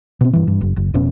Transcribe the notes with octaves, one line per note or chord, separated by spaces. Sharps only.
B2 C4
G2 E3
G2
F#1
F#1
F1 B2 C#4